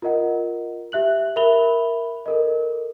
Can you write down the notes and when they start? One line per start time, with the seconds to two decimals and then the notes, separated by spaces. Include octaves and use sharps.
0.02 F4 A#4 D#5 F#5
0.92 G4 E5 F#6 F#7
1.36 A#4 E5 B5 F7 G7
2.26 A4 A#4 D#5